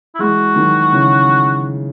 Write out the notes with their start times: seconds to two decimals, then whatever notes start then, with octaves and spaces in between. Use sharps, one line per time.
0.15 E4
0.19 E3 G#3 F#4
0.56 D#3 F#3
0.92 C#3 E3